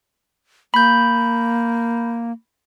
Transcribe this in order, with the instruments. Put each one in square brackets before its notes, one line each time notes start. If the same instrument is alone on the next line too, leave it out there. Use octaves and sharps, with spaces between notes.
[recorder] A#3 [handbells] B5 G6